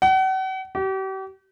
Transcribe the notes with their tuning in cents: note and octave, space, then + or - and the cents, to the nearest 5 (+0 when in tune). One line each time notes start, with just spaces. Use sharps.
F#5 +40
G4 -40